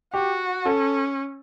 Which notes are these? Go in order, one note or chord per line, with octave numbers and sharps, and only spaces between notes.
F#4 G4
C#4 A4